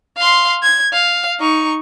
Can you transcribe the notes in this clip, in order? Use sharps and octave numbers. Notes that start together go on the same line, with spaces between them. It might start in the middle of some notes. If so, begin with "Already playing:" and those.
F5 C6
G#6
F5
D#4 C#6